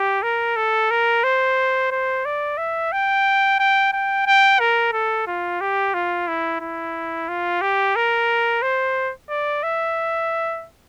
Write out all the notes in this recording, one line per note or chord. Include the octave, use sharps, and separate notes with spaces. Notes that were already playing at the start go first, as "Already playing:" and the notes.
Already playing: G4
A#4
A4
A#4
C5
C5
D5
E5
G5
G5
G5
G5
A#4
A4
F4
G4
F4
E4
E4
F4
G4
A#4
C5
D5
E5